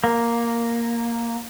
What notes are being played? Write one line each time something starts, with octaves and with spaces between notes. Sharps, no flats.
A#3